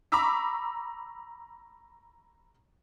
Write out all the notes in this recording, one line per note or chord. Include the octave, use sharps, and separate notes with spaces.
A#5 B5 C#6 D6 E6 B6